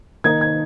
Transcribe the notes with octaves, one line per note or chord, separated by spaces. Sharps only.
D#3 A#3 D#4 G#6
G#6